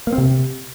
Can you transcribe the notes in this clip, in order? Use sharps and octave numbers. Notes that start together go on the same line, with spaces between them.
A#3
C4
C3